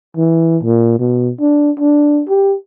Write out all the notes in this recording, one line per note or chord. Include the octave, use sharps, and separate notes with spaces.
E3
A#2
B2
D4
D4
G4